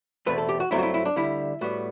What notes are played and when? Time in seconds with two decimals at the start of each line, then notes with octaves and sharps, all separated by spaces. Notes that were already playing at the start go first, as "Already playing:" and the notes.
0.26 E2 B2 A3 C4 B4
0.38 A4
0.49 G4
0.60 F#4
0.71 G2 F#3 A3 C4 E4
0.79 F#4
0.83 E4
0.94 E4
1.05 D4
1.16 D2 D3 G3 E4
1.61 A2 G3 B3 F#4